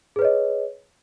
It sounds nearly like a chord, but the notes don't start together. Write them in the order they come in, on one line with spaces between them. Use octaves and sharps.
G#4 B4 C#5 D#5